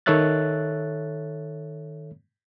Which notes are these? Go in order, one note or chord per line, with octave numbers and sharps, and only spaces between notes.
D#3 A4 C#5 E5 F#6 A6